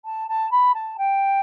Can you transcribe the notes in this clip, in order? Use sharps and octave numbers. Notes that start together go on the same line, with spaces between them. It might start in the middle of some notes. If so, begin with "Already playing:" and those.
A5
A5
B5
A5
G5